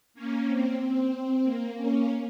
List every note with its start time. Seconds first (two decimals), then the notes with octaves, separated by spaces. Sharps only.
0.14 A#3 C#4
0.47 C4
0.79 C4
1.44 A#3
1.76 A#3 C#4